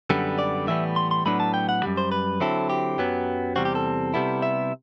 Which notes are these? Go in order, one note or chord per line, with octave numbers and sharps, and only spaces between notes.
F#2 D3 G3 B3
D5
A2 E3 G3 B3 E5
C6
C6
A2 F#3 B3 D4 B5
A5
G5
F#5
F#2 E3 G3
C5
B4
D3 F#3 C4 E4 A4
G4
F#2 F#3 B3
E2 C3 G3 C4 F#4
G4
A4
C3 G3 B3 E4
E5